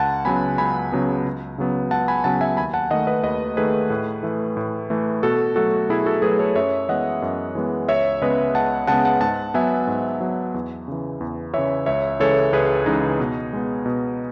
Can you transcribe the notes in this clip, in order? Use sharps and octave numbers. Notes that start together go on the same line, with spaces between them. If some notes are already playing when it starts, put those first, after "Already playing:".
Already playing: C#2 F#5 A5
C#3 F#3 B3 G#5 B5
C#2 G#5 B5
C#3 F#3 B3
C#2
C#3 F#3 B3
C#2 F#5 A5
G#5 B5
C#3 F#3 B3 F#5 A5
E5 G#5
D#2 G#5 B5
F#5 A5
D#3 A3 D#5 F#5
B4 D#5
D#2 B4 D#5
D#3 A3 G#4 B4
A2
E3 A3
A2
E3 A3
B2 F#4 A4
F#3 A3 F#4 A4
B2 E4 G#4
F#4 A4
F#3 A3 G#4 B4
A4 C#5
F#2 C#5 E5
E3 G#3 B3 D#5 F#5
F#2
E3 G#3 B3
C#2 C#5 E5
C#3 G#3 B3 B4 D#5
C#2 F#5 A5
C#3 G#3 B3 F#5 A5
F#5 A5
G#2 F#5 A5
F#3 B3 E5 G#5
G#2
F#3 B3
E2
C#3 E3
E2
C#3 E3 C#5 E5
C#2 C#5 E5
C#3 E3 G#3 A4 C#5
C#2 G#4 B4
C#3 E3 G#3 D#4
B2
G#3 B3
B2